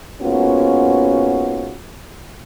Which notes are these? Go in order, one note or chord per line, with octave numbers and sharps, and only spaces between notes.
G#2 A#3 B3 C#4 F4 F#4